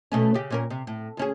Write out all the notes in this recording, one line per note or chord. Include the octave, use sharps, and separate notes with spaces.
B2 A3 C#4
C#3 G4
A#2 C#4 A#4
C3
A2
D2 C#4 G#4